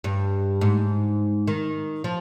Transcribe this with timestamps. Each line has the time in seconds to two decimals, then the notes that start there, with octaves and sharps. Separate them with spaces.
0.04 G2
0.61 G#2
1.48 D#3
2.04 F3